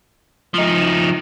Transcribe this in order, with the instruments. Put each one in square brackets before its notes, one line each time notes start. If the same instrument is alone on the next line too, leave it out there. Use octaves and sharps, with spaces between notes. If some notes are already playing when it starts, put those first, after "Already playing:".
[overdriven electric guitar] F3 D#4